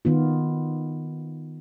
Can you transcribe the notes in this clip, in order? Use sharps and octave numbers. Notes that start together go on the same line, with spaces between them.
D#3 B3 F4